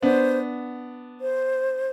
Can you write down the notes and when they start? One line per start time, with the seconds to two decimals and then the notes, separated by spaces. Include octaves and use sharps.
0.02 B3 D4 C5
1.21 C5